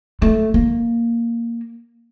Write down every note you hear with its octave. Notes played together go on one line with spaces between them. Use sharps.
A3
A#3